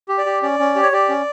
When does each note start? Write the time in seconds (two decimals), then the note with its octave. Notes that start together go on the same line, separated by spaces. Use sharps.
0.09 G4
0.18 D5
0.26 G4
0.43 C#4 D5
0.59 C#4
0.76 G4
0.83 C#5
0.92 G4 D5
1.09 C#4